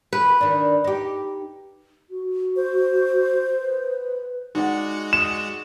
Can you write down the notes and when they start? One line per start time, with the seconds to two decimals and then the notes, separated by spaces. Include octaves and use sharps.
0.13 B4
0.41 D#3 D4
0.84 D#4 G4
2.10 F#4
2.56 C5
3.59 B4
4.55 G#3 D#4 F#4 D5 F#5 C#7
5.13 D5 D#6 E7